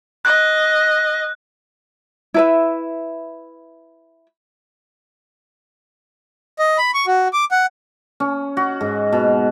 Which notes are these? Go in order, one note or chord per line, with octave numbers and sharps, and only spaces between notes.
D#5 F#6
E4 B4 E5
D#5
B5
C#6
F#4
D6
F#5
C#4
F#4
G#2
B2